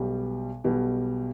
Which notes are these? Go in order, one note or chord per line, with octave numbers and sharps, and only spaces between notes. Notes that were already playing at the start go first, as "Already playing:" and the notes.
Already playing: B1 B2 G3
B1 B2 G3